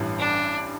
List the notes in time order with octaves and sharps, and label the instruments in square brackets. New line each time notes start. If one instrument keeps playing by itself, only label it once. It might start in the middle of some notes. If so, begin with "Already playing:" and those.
Already playing: [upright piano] A1 G2 E3 G3
[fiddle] D4